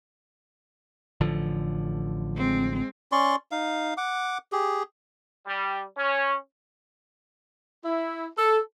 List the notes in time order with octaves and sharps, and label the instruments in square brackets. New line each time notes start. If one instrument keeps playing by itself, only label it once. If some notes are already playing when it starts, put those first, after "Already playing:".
[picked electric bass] A1 D3 F3
[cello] G#3 C4
[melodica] C#4 D5 C6 C#6
D#4 F5
F#5 D6
G4 G#4
[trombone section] G3
C#4
[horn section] E4
A4